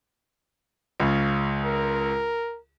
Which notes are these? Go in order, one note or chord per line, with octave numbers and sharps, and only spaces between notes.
C#2 C#3
A#4